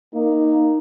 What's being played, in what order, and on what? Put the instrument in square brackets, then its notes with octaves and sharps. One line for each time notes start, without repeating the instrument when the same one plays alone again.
[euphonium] A#3 [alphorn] D#4